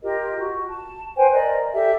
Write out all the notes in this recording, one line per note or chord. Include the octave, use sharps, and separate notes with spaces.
F4 G4 A#4 D#5
F#4
A5
B4 C5 G5 G#5
A#4 D5 D#5
G4 A4 D5 E5